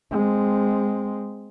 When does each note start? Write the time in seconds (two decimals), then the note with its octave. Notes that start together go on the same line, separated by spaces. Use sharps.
0.11 G#3 C4